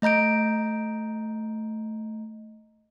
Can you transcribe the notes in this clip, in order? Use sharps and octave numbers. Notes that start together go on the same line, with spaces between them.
A3 D#5 A#5 G6 D7